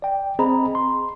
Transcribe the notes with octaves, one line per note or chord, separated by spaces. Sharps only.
D5 G5
C4 G#4 C5 D#5 A#5 B5
C6